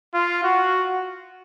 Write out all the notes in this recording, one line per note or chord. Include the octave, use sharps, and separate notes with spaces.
F4
F#4